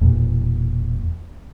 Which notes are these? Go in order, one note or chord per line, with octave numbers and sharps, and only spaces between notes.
E1 E2 A#2